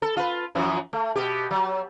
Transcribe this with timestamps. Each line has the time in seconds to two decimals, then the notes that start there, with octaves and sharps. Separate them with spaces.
0.02 A4
0.17 F4 B4
0.55 F#2 E3 F3
0.93 A3
1.15 B2 G4
1.51 F#3